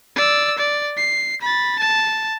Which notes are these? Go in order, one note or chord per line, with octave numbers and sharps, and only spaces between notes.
D5 E6
D5
C7
B5 A6
A5